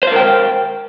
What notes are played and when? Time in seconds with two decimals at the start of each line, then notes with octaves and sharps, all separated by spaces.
0.03 C5
0.07 F5
0.12 A#4
0.16 G5